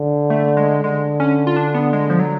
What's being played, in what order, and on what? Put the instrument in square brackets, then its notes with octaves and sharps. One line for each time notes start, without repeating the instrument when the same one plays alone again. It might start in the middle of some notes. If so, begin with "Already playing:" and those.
Already playing: [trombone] D3
[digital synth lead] A3
G#3
[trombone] D3 [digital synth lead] G#3
[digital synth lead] C#4
F4
D4
B3
G#3
F3
F#3